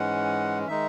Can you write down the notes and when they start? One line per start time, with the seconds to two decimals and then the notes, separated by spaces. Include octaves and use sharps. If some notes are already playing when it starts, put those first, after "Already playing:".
Already playing: G#2 E3 G#3 C#4 F#5
0.68 D#3 G#3 D#4 E5